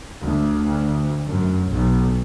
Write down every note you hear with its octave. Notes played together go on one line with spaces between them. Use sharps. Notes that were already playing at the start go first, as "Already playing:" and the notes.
D2
F#2
B1